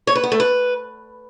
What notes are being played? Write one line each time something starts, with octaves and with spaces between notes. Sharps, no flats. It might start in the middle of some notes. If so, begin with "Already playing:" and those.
C#5
B4
B3
A3
B4